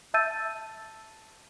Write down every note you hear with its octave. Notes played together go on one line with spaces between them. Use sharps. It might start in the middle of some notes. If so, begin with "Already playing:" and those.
E5 A5 E6 G6 A6 D#7